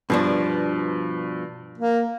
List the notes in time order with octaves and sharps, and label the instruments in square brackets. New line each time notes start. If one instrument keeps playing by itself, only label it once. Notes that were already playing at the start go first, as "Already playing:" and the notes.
[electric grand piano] G2 [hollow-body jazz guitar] B2 F3 D4
[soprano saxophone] A#3